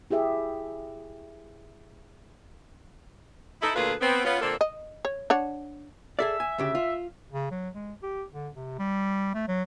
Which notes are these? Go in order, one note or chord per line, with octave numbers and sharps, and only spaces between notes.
E4 G4 G#4 E5
D#4 E4 A4
D2 A#2 F4 G#4 A4 B4
B3 C4
B3 C#4 F4
A#2 D3 A#3 C4 A4
D#5
C#5
D4 C#5 F#5
G#4 A4 D5 E5
G#5
D2 C#3 G4
F4
C#3
F#3
G#3
G4
D3
C3
G3
A3
F#3